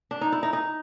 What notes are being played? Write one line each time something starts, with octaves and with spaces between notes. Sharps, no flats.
D4
D#4
E4
D#4
D#4